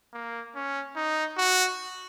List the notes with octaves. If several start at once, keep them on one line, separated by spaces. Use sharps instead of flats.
A#3
C#4
D#4
F#4